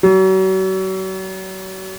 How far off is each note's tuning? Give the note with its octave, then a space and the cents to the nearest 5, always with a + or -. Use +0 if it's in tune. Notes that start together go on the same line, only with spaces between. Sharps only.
F#3 +40